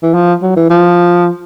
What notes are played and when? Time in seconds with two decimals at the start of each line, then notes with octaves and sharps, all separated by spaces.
0.03 E3
0.14 F3
0.42 F#3
0.57 E3
0.70 F3